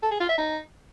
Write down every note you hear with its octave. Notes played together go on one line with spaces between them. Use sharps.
A4
G#4
F4
E5
D#4